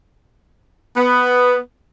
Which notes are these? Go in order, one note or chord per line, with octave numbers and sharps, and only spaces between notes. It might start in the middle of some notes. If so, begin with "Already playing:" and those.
B3